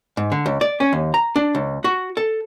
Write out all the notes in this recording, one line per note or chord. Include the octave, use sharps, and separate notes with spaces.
G#2
D3
C#2
D5
C#4
D#2
A#5
D4
C#2
F#4
A4